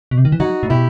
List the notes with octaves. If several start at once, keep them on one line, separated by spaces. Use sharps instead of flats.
B2
C3
D#3
E3
F#3 D#4 F#4
A2
B2 E4 G4